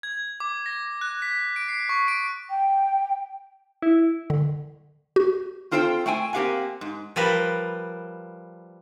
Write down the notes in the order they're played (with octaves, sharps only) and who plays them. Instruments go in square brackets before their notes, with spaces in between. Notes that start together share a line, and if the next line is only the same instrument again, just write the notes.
[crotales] G#6
D6
A#6
F#6
B6
D7
C7
C#6
D7
[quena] G5
[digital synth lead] E4
[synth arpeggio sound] D3
F#4
[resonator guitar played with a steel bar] C4 F4 A4 C5 E5 G5
A3 C5 G5 G#5
A#3 C4 G4 F5 F#5 G#5
G#2
[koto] F3 G3 A#4 B4